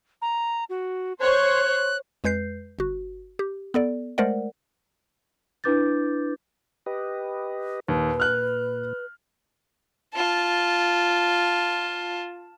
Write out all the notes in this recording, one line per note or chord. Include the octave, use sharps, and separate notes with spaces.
A#5
F#4
C5 C#5 F#6
F2 G#3 B4 G6 C7
G1 F#4
G4
B3 A4 D5
G#3 A3 A#4 C5 D5 F#5
D4 E4 B4 D6 G6 A6
G4 B4 D#5
D#2 A#2 B4
F6 F#6
F4 A5